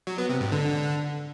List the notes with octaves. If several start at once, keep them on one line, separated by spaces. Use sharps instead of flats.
F#3
B3
C3
G#2
D3